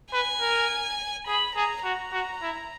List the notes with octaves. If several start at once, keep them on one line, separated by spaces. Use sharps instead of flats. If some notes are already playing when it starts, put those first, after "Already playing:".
B4 G#5
A#4
G#4 B5
G#4 A#5
F#4 A#5
F#4
E4